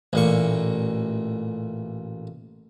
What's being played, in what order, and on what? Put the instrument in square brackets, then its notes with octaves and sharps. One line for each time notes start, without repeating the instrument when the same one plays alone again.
[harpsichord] A1 A#2 C#6